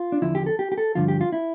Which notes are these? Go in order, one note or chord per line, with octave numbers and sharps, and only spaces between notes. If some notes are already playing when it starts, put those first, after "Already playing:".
Already playing: F4
D4
E2 D3 F3 E4
G4
A4
G4
G4
A4
G2 D3 F3 F4
G4
F4
E4